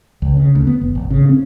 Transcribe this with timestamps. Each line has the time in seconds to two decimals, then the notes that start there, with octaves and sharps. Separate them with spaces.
0.22 C#2
0.37 C#3
0.55 D2
0.67 B3
0.81 F1
0.95 G#1
1.10 C#3
1.29 C4